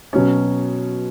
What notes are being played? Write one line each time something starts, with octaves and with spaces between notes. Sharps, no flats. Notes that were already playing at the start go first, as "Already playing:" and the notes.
B2 F#3 C#4